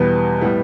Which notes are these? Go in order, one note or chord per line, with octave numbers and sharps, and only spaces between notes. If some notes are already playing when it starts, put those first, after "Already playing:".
Already playing: E2 B2 G3 B3
A2 G3 B3